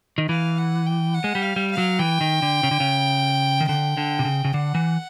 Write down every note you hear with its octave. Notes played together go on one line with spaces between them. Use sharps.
D#3
E3 F5
F#5
G5
F#5
G#3
G3
F5
G3
F5
F#3
E3 G5
D#3
D3
C#3
D3
C#3
D#3
D3 G5
D3
C3
C#3
C#3
D3 F#5
E3